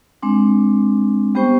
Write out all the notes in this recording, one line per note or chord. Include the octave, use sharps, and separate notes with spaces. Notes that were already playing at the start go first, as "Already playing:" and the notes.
G#3 C4 D4
G3 B3 G4 C5 G5 C#6